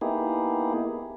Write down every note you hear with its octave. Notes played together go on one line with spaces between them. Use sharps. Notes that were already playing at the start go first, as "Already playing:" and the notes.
A#3 B3 D#4 E4 G4 G#4